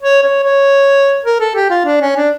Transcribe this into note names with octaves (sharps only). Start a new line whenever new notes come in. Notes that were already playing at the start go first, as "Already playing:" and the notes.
C#5
C#5
C#5
A#4
A4
G4
F4
D4
C#4
D4